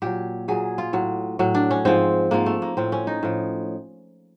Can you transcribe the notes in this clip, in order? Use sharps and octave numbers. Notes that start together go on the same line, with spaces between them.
A#2 F#3 G4
A#2 F#3 G#4
F4
A2 F#3
A2 F#3
D4
C#4
G#2 F3 C4
G#2 F3 A#3
A3
A#3
A2 F3 C4
C#4
D#4
A2 F3